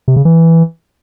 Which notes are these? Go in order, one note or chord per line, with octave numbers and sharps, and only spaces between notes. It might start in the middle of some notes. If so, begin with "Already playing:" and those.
C3
C#3
E3